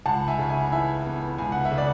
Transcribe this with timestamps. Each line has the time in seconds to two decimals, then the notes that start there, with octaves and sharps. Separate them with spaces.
0.06 C#2 F#5 A5
0.28 E5 G#5
0.39 C#3
0.50 E5 G#5
0.72 E3 E5 G#5
1.06 B3
1.38 C#2 G#5
1.52 F#5
1.65 E5
1.71 C#3
1.78 D5